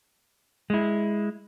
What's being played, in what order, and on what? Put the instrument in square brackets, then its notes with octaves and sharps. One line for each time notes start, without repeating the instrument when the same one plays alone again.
[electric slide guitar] G#3 E4